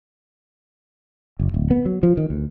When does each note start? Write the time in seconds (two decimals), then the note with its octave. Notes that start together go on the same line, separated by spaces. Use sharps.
1.39 F#1
1.54 D1
1.71 B3
1.85 F#3
2.03 F3
2.17 D#3
2.30 D2